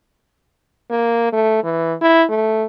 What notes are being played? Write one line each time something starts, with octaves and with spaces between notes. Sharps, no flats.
A#3
A3
E3
E4
A3